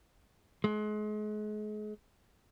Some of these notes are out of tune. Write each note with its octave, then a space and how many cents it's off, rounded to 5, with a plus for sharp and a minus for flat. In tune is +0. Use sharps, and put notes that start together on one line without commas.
G#3 +35